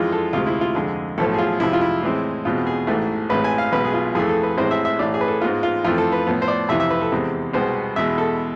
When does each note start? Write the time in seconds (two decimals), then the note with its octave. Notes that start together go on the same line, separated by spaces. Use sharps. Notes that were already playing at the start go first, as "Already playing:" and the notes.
Already playing: F2 E3 G#3 F4
0.12 A4
0.33 D2 C3 G#3 F4
0.47 E4
0.61 F4
0.75 F2 D3 G#3 G#4
1.18 B1 A2 F3 A4
1.34 G#4
1.38 F4
1.60 F2 C3 G#3 E4
1.73 F4
1.81 E4
2.03 A2 E3 G#3 C4
2.45 E2 B2 G#3 C4 F4
2.67 G#4
2.87 A1 G#2 E3 A3
3.29 A1 A2 G#3 C4 B4
3.44 G#5
3.58 F5
3.72 B1 B2 G#3 B4
3.85 G#4
3.93 F4
4.15 F2 E3 A3 G#4
4.29 A4
4.43 B4
4.57 A1 A2 E3 G#3 C4 C5
4.71 E5
4.85 E5
4.99 A1 A2 E3 D5
5.14 G#4
5.21 B4
5.28 A4
5.42 G#2 G#3 B3 F4
5.63 F4
5.84 F2 E3 A3 C4 F4
5.98 A4
6.12 B4
6.27 A2 F3 B3
6.42 C5
6.48 D5
6.69 F2 C3 E3 E5
6.80 E5
6.90 B4
7.01 A4
7.12 E2 C3 G#3 C4
7.53 C2 B2 G#3 B3 C5
7.96 E2 B2 G#3 E5
8.18 A4